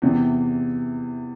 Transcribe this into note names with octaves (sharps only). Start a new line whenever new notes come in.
E2 C3 E3